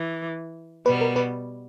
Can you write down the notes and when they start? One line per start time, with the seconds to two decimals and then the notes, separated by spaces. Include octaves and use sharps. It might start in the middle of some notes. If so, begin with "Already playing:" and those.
Already playing: E3
0.86 B2 G3 B3 B4
1.01 A#4
1.16 B4